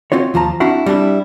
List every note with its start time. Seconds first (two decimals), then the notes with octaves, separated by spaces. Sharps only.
0.12 C4 F4 F#4 C#5
0.34 D#2 F3 F4 A5 A#5
0.60 C4 D4 E4 F#4 F5 F#5
0.86 G3 C4 D4 E4